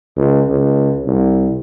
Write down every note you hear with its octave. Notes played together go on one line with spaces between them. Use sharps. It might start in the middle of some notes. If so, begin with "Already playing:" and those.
C#2
C#2
C2